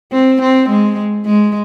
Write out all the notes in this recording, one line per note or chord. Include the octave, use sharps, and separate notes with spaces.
C4
C4
G#3
G#3